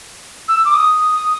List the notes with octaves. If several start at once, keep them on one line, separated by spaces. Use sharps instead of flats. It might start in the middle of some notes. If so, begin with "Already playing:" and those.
E6
D6
D#6